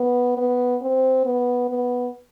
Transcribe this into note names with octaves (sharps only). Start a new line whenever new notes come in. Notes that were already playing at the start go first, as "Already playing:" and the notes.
Already playing: B3
B3
C4
B3
B3